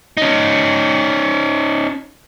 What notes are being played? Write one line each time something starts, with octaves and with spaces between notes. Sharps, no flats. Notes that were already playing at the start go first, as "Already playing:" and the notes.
C#4 D#4